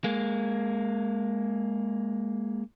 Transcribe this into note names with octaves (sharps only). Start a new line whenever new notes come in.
G#3 A#3